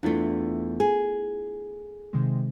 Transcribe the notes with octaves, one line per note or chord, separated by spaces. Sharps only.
E2 A3 D4 E4 F4
G#4
C3 D#3 G#3